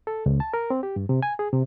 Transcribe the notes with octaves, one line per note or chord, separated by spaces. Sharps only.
A4
C#2
A5
A#4
C4
G4
G2
C3
G#5
G#4
C3